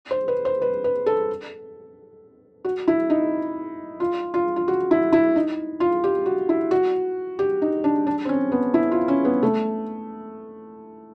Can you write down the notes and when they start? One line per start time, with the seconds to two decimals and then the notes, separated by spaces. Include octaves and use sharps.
0.11 C5
0.28 B4
0.45 C5
0.62 B4
0.84 B4
1.06 A4
2.65 F#4
2.88 E4
3.10 D#4
4.00 F4
4.34 F4
4.56 F4
4.68 F#4
4.91 E4
5.13 E4
5.36 D#4
5.80 F4
6.04 G4
6.26 F#4
6.49 E4
6.71 F#4
7.39 G4
7.62 D#4
7.84 D4
8.07 D4
8.25 C4
8.29 C#4
8.52 B3
8.74 E4
8.92 F4
9.08 C#4
9.25 B3
9.43 A3